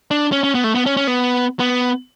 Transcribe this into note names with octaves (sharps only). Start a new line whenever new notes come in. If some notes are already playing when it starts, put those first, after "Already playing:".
D4
C#4
C#4
B3
A3
B3
C#4
C#4
B3
B3